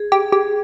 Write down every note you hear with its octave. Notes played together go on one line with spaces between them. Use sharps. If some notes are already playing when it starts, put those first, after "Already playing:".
Already playing: G#4
G4 G#4
G4 G#4